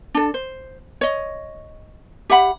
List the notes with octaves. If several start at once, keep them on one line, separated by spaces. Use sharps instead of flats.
D4 A4
C5
C#5 D#5
G4 E5 F#5 B5